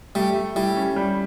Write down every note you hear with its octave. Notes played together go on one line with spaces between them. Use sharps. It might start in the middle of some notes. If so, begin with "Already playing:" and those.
G3 A3
A3
G3 E4
C#4
G3